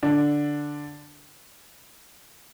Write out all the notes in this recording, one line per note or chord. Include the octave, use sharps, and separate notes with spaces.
D3 D4